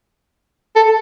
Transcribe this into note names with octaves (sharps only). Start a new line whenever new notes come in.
A4